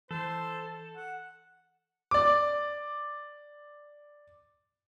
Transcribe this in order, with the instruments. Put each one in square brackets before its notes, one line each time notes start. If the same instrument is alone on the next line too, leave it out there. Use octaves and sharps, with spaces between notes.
[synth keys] E3 [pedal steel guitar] A4 [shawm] C5
[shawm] F#5
[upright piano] D5 D6